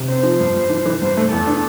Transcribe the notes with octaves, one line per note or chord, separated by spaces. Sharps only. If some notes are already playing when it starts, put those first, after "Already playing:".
Already playing: C3
C4 C5
F3
G2
G2
E3
E3
G2 C5
A3
E2 A4
D4